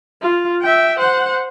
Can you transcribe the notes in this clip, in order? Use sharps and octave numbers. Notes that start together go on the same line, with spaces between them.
F4
E5 G5
C5 F#5